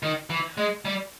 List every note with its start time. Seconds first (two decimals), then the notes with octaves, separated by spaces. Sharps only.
0.03 D#3
0.30 E3
0.57 G#3
0.85 G3